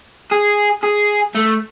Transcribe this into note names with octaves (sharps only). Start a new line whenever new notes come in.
G#4
G#4
A3